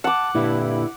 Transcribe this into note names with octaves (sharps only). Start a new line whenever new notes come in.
F#5 A5 D6
G2 A#2 D3 E4 A4